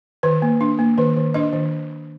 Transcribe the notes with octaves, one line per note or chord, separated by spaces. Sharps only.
D#3 B4
A#3
D4
A#3
D#3 B4
D#3
D4 D#5
D#3